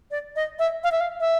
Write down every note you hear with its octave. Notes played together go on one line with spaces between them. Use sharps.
D5
D#5
E5
F5
E5
F5
E5